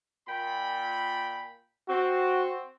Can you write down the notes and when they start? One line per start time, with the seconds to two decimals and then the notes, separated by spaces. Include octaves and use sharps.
0.28 A#2 G5 B5
1.89 C4 F#4